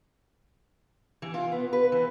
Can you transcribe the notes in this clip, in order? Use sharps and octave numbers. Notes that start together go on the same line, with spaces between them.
E3
F4
B3
B4
E3